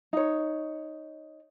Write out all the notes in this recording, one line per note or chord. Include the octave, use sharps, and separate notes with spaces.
D#4 C#5